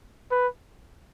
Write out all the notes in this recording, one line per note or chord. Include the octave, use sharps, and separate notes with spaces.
B4